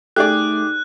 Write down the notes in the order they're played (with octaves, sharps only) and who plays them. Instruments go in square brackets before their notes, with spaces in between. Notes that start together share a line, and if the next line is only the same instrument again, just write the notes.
[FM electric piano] A3 [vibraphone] D#4 D6 [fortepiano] G4 G#4 D5 [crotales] F#6